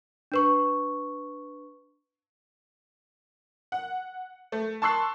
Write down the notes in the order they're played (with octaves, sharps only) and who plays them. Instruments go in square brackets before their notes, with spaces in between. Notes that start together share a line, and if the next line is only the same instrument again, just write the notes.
[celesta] D4 B4 C#6
[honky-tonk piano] F#5
A3
A5 C6 C#6 E6 F#6 C7